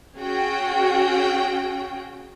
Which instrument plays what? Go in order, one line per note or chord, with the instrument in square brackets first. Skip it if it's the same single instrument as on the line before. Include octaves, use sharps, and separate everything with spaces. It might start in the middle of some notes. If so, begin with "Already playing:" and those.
[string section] C#4 F#4 G#4 G5